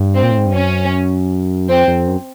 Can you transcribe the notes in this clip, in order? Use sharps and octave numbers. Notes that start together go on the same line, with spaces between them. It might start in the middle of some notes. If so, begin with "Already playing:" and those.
Already playing: G2
C4
A#2
A2
G#2
G2
F#2 C#4
F2 C4
F2
F#2